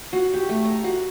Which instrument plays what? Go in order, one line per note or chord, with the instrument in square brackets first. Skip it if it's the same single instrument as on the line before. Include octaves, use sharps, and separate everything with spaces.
[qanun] F#4
G4
A3
A#5
F#4